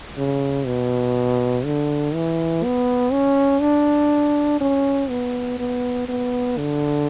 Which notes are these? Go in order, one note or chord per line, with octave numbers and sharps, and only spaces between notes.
C#3
B2
D3
E3
B3
C#4
D4
C#4
B3
B3
B3
D3